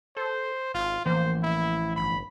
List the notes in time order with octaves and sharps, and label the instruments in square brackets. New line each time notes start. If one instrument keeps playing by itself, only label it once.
[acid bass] A4 [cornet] C5
[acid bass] G#1 [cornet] F4
[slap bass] A1 E3 F3 [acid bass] A#3 [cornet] C5
[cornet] E4
[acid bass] G1 [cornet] B5